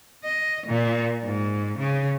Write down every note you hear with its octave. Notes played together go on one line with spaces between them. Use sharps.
D#5
A#2
G#2
C#3